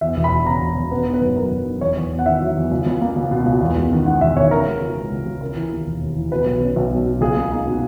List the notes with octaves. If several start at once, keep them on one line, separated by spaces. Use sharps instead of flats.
E2 E5
E1
B5
E1
C#3 A#5
E1
E1
B3 B4
D#4
B4
F#2
F#2 A#4
F#2
D#4
E2 C#5
E2
E2
F#5
D#3 E5
F#3
E2
C#2
C#2
A#3
C#2
B2
C#2
E2
G#3
D#3
D#3 F#5
E1 E5
D#3 C#5
C#3 A#4
G#3
C#2
C#2
C#2
C#2
C#3 A#4
E3
D#2
E1
D#2
E3
B2 B4
B1
C#4
B1
F#3
B2
C#2 G#4
A#3
D#4
B2